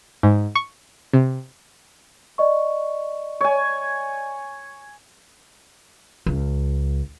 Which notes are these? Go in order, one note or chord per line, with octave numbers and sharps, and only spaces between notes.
G#2
C#6
C3
D5 D#5 C#6
C#5 G#5
C#2